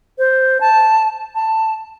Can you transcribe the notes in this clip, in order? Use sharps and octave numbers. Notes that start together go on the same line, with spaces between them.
C5
A5
A5